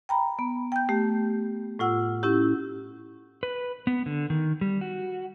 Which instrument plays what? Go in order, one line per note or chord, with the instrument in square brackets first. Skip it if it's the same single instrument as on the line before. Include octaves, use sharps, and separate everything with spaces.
[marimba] G5 A#5 B5
B3
G5 G6
A3 G4
A2 F4 F#5 E6
C#4 E4 G4
[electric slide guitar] B4
B3
D3
D#3
G3
F#4